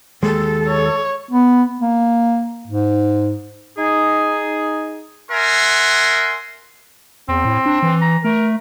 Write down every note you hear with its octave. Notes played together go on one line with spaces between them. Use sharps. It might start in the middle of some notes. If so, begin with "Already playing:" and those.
D#2 G#3 A4
C#5
B3
A#3
G#2
D#4 G#4
A#4 E5 F#5 G#5 C6
E2 C4
A2
D4
E3
A#5
A3 A#4